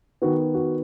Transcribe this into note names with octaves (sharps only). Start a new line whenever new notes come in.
D#3 B3 F#4
F#4